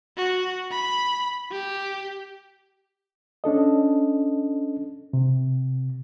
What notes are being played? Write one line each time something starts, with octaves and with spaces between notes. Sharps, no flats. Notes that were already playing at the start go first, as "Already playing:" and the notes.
F#4
B5
G4
C#4 D4 A4 D#5
C3